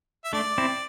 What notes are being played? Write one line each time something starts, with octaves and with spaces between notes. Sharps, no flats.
E5
A3 D4 D5
C4 E4